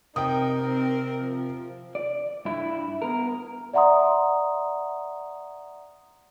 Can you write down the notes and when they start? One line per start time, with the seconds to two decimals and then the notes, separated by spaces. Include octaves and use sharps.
0.16 C3 D#4 A#4 G5 D#6
0.63 C4
1.17 F3
1.95 D5
2.45 G2 E4
3.02 B3 A#4
3.73 D5 E5 F#5 A#5 C6 D#6